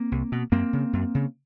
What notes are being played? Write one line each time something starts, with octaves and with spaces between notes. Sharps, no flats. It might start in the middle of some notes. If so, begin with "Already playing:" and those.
Already playing: A#3 C4
C2
B2
F#2 A#3 C4
C#3
F#2
C#3